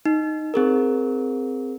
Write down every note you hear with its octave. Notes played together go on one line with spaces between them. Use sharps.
D#4
C4 G#4 A#4